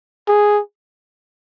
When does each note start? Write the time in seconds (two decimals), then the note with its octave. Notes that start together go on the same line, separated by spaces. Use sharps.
0.28 G#4